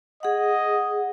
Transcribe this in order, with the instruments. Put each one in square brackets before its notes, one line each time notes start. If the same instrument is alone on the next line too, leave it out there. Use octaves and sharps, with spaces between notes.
[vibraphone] G#4 F#5 [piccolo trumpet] D#5